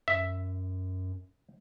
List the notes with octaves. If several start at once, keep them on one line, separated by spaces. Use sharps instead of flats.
F#2 E5